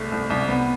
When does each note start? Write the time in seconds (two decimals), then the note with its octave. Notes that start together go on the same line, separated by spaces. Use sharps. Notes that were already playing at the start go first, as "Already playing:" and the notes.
Already playing: C2 A3
0.12 C2
0.30 C2
0.49 B3